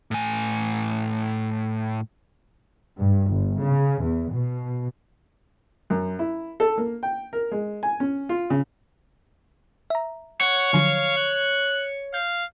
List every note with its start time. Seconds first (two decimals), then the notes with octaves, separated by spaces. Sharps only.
0.11 A2 G#5
2.98 G2
3.29 G1
3.59 C#3
4.01 E2
4.32 B2
5.90 F#2
6.19 E4
6.60 A4
6.78 A#3
7.03 G5
7.33 A#4
7.52 G#3
7.83 G#5
8.00 C#4
8.29 F4
8.50 C#3
9.90 E5 A#5
10.41 C#5 F#5
10.73 D3 F3 F#3 F5
11.18 F#6
12.14 F5 G6